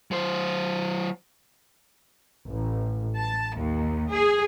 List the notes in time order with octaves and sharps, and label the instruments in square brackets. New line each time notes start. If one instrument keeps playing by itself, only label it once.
[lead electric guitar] F#3 C5
[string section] A1
A5
D#2
G#4